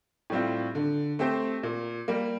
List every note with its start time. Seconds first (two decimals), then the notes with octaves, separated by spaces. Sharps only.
0.30 A2 G3 C4 F4
0.75 D3
1.19 A3 C4 G4 C5
1.63 A#2
2.08 G3 A#3